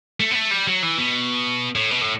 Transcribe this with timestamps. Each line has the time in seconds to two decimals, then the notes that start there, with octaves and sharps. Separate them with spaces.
0.20 A3
0.31 B3
0.35 A3
0.51 G3
0.67 F#3
0.83 E3
0.98 B2
1.75 A2
1.91 B2
2.01 A2